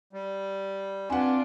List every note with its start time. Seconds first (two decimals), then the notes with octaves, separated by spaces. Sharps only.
0.13 G3
1.10 C4 D4 F4 B4 F#5 G#5